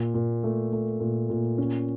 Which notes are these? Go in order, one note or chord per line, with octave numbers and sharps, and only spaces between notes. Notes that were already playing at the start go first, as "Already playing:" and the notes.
Already playing: A#2
A#2
A3
A3
A#2
A#2
C#4